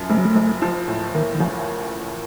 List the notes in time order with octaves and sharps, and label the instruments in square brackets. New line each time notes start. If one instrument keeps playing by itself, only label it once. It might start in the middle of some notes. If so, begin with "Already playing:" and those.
Already playing: [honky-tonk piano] F#2 F3
[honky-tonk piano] F#1 [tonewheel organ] A3
[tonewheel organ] F#3
A3
[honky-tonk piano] F#1
F3
A2
[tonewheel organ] D#3 [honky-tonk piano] A#3
[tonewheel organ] D#3
[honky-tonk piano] A1 [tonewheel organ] F3